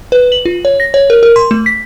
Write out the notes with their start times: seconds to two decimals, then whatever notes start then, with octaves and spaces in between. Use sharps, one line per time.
0.12 B4
0.32 F#7
0.45 F4
0.65 C#5
0.80 A#6
0.94 C#5
1.10 A#4
1.23 A#4
1.36 C6
1.51 A3
1.66 B6